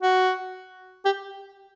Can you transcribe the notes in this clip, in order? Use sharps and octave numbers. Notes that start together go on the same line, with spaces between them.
F#4
G4